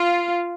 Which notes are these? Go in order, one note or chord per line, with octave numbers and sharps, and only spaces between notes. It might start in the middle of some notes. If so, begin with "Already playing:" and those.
Already playing: F4